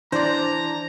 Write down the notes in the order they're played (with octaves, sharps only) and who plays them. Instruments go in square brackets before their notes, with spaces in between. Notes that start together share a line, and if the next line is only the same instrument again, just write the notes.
[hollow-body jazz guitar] E3 [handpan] D4 [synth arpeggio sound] C5 D5 [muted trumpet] A#5